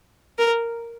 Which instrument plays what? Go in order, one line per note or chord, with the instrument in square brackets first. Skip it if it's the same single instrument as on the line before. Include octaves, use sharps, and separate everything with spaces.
[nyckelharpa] A#4